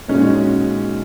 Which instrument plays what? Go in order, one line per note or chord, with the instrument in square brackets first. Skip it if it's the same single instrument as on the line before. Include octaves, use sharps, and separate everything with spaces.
[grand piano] A#2 G#3 D#4 F#4 [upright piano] C#4